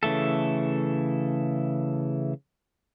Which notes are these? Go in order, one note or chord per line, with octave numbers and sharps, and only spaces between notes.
C#3 E3 A3 A4